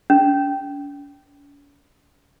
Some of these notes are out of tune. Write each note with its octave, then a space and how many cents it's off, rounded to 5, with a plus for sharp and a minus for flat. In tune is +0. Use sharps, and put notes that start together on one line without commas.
C#4 +45